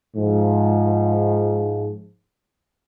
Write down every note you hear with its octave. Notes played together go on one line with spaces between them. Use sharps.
G#2 F3